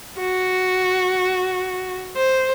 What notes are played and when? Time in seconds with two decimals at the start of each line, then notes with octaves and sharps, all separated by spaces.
0.20 F#4
2.16 C5